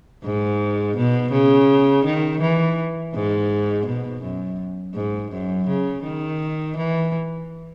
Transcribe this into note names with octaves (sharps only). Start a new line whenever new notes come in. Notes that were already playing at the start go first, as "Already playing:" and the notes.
G#2
B2
C#3
D#3
E3
G#2
B2
F#2
G#2
F#2
C#3
D#3
E3